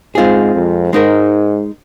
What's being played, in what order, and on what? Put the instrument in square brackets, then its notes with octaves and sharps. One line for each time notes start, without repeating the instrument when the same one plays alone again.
[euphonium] G#2 [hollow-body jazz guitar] G#3 C4 F4 G#4
[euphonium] F2
[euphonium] G#2 [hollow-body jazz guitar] G#3 D#4 A#4